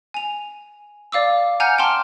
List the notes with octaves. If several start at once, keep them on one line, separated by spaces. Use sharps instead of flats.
G#5 F7
D5 F5 D6 E6
F#5 G#5 A#5 F6 G6 C#7
G5 A5 A#5 C6 D6 F6